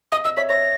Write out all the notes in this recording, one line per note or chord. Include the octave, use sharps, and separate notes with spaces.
D#5 D#6
D#5 E6
C#5 E5 B6
C#5 E5 A#6